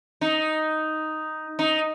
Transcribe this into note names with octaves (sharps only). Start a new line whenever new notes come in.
D#4
D#4